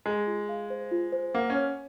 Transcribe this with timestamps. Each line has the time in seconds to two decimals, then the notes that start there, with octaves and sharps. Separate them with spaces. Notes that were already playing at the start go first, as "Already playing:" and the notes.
0.06 G#3 A#5
0.27 F4
0.49 F5
0.70 C5
0.91 F4
1.12 C5
1.34 A#3 F#5
1.50 C#4
1.56 C#5